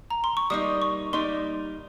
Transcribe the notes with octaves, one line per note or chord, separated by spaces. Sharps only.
A#5
C6
C#6
G3 A#3 D#4 D#6
C#6
G3 A#3 D#4 C6